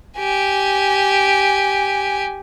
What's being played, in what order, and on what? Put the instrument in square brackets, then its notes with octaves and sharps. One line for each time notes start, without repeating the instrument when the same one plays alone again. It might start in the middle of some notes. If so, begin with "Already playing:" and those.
[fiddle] G4 G#5